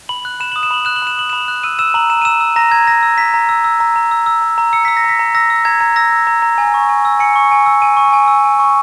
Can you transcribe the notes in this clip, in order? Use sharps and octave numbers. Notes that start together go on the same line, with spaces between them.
B5 F#7
F#6
B5 E7
D#6 F#7
E7
B5 F#7
F#6 E7
F#7
B5 E7
D#6 F#7
B5 E7
F#6
E6 D#7
E6 E7
A#5 F#7
A#5 E7
D#7
E6 E7
E6
A#5 A#6
A#5 G#6
E6 A#6
E6
A#5 B6
A#5
E6
E6
A#5
A#5
E6
E6
A#5
A#5
E6 C#7
E6 B6
A#6
A#5 B6
A#5
E6 A#6
E6
A#5 G#6
A#5
E6 A#6
E6
A#5
A#5
G#5
C#6
G#5
E6
G#5 C#7
C#6
G#5
E6
G#5 D#7
C#6
G#5
E6
G#5
C#6